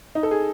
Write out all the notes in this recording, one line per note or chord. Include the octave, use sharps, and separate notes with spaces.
D#4
A4
G#4